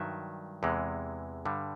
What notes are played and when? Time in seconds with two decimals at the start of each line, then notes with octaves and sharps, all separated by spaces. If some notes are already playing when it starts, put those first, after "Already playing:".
Already playing: G2 D#3 F#3 E5
0.63 E2 C3 E3 G#3
1.45 G2 D3 G3